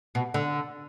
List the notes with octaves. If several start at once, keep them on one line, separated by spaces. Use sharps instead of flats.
B2
D3